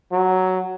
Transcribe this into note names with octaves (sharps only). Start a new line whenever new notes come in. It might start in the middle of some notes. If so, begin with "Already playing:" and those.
F#3